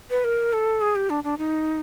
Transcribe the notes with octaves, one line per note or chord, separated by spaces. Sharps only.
B4
A#4
A4
G#4
G4
D4
D4
D#4